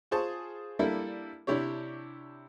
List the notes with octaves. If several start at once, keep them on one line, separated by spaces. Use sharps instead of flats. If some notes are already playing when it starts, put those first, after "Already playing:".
F4 G#4 C5 A5 C#6
G3 A#3 D4 E4 A4 E5
C3 D4 E4 G4 C#5